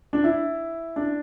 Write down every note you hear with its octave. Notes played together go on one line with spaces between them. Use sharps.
D4
E4
D4